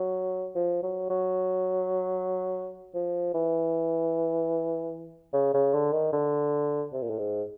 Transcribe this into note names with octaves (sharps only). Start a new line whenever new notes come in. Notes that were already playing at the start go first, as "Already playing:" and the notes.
Already playing: F#3
F3
F#3
F#3
F3
E3
C#3
C#3
D3
D#3
D3
C3
A#2
A2
G#2